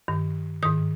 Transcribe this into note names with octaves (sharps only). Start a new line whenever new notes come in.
G2 D#3
G#2 D#3 D#6